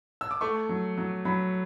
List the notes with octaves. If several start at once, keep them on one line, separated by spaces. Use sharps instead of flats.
E6
D6
A3 C#6
F#3
F#3
F#3 B5